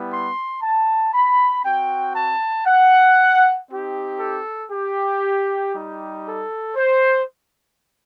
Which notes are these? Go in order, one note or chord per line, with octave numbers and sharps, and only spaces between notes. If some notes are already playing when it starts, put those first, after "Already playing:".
Already playing: G3 B3 E4
C6
A5
B5
C4 F#4 G5
A5
F#5
C4 D#4 G4
A4
G4
G3 D#4 G4
A4
C5